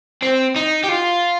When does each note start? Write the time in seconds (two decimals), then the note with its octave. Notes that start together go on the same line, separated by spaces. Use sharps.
0.22 C4
0.56 D#4
0.84 G4
0.89 F4